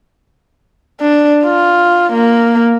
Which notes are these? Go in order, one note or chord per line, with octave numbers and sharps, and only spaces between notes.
D4
F4
A#3